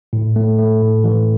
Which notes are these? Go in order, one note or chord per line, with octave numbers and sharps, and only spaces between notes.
A2
A3
A3
A2
E3